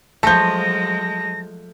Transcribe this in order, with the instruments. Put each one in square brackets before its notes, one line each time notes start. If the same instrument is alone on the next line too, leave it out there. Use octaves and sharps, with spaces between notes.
[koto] F3 A3 [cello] F#3 G#3 [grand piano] A5 G6 [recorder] A#6